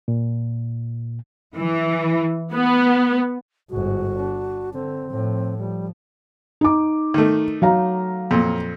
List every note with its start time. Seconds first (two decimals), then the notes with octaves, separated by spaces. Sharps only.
0.08 A#2
1.56 E3
2.53 B3
3.70 G1 G#2 F#4
4.19 D4
4.74 D3 C4
5.10 A2 F3
5.58 F3 G3
6.61 D#4 D6
7.14 D#3 A3
7.62 F#3 F5 A#5
8.31 F2 A#2